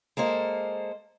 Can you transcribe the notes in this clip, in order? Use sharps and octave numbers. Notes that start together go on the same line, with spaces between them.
G#3 A#3 A4 C5